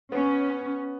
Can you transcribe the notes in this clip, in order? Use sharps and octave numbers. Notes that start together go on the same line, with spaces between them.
B3 C#4